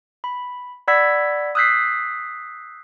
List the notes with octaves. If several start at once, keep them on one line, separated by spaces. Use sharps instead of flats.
B5
D5 F#5 B5 E6 G#6 B6
D#6 E6 F#6 G6 B6 C7